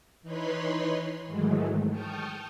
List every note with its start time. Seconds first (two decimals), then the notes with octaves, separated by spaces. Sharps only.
0.22 E3 D#4 B4 C#5 B5 C6
1.26 G#2 D#3 E3 F#3 G#3 A3
1.89 G5 A5 C#6 D#6 F6 G6